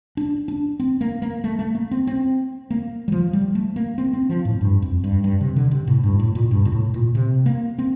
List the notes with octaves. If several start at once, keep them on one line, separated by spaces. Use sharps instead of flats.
D4
D4
C4
A#3
A#3
A3
A3
A#3
C4
C4
A#3
G3
F3
G3
A3
A#3
C4
C4
F3
A2
G2
F2
G2
G2
C3
D3
C3
A2
G2
A2
A#2
G2
A#2
A2
A#2
C3
A#3
C4